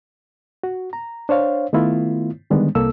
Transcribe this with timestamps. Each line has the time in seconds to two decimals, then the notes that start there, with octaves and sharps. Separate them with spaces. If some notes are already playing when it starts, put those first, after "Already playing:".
0.64 F#4
0.93 A#5
1.29 D4 C5 C#5 F5
1.73 D#3 A3 B3 E4 F4
2.50 D3 D#3 G3 G#3 B3 D4
2.75 C2 A#3 A4 E6